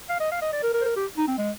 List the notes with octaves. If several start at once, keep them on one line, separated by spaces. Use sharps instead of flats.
F5
D#5
F5
D#5
D5
A#4
A#4
C5
A#4
G4
D#4
C4
G#3